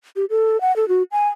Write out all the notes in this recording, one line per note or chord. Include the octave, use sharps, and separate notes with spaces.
G4
A4
F#5
A4
F#4
G#5